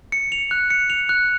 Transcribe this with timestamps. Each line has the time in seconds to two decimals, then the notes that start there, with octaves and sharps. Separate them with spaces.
0.12 C#7
0.32 F7
0.51 F#6
0.70 C#7
0.90 F7
1.09 F#6